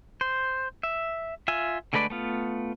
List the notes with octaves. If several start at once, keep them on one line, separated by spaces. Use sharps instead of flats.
C5
E5
F4 E5 G#5
D3 G#3 A3 B4 D5
A3 B3 F4